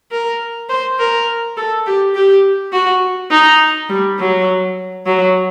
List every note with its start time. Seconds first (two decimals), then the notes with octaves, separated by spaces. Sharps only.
0.11 A#4
0.69 C5
0.99 A#4
1.57 A4
1.86 G4
2.15 G4
2.73 F#4
3.31 D#4
3.89 G3
4.19 F#3
5.06 F#3